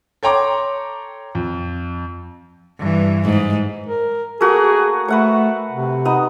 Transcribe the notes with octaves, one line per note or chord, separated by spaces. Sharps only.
A4 C#5 G5 A#5 C6 D6
F2
G2 E3
G#2
A#4
A3 A#3 F#4 G#4
A3 B4 F#5 C#6
C3
B3 D#4 D#5